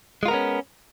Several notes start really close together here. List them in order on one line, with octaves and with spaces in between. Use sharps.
G#3 F4 A#4 B3 C#4